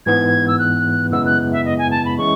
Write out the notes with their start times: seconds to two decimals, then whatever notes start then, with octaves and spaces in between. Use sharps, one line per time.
0.06 G#2 E3 B3 G#6
0.48 E6
0.59 F#6
1.11 F#2 C#3 G#3 B3 E4 E6
1.26 F#6
1.52 E5
1.65 D#5
1.78 G#5
1.91 A5
2.05 B5
2.18 E3 G#3 C#4 E4 C#6